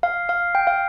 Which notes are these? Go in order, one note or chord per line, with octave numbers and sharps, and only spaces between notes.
F5
F5
G5
F5